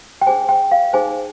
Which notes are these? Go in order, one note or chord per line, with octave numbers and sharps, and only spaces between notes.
G5
D4 G#4 C5 G#5
G5
F5
D#4 G#4 C5 G#5